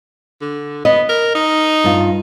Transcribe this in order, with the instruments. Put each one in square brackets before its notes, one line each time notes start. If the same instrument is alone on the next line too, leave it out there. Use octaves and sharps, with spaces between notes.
[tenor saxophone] D3
[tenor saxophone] B3 [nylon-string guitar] D#5
[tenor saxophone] A#4
D#4
[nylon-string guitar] G2 F4